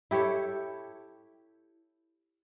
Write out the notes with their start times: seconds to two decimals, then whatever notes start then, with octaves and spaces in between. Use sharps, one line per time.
0.11 E4 G4 A4 C#5